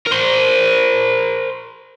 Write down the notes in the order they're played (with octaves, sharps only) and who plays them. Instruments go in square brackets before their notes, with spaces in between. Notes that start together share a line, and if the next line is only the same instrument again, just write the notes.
[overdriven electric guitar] A#4 C5